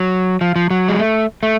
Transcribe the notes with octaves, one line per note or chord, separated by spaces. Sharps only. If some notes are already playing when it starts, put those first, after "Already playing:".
Already playing: F#3
F3
F3
F#3
G#3
A3
A3